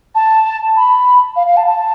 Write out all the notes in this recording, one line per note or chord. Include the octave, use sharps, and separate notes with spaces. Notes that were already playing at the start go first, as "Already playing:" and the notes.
A5
B5
F5
F5
A5
A5